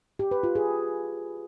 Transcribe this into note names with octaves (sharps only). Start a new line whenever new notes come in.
G4
B4
F4
G#4